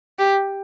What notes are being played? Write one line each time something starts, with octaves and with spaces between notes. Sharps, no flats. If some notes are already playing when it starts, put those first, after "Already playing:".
G4